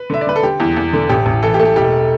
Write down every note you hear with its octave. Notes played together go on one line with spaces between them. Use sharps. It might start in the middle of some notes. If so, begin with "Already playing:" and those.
Already playing: B4
D3 E5
D5
D3 B4
A4
D3 G4
E2
E2
D3
A1 G4
A1
E3 A4
G4
A3
G4
E1 G4